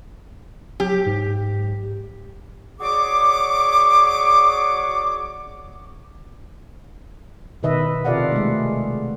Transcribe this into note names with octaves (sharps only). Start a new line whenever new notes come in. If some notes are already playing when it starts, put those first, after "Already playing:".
F#3 G4
G#2
F#4 G#4 C#5 D5 C#6 D6
B2 D#3 B4 D#5 E5
C3 F4 A4 D5 F5 F#5
G#3 A3